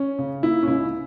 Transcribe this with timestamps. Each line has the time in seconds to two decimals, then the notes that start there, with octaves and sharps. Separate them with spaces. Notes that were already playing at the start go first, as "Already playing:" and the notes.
Already playing: C#4
0.19 C#3
0.42 A#3 E4
0.63 C#4
0.67 C#2 E4